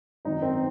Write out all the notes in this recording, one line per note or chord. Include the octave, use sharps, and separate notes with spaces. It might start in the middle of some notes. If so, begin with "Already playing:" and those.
G#1 F#2 D#3 D#4
C4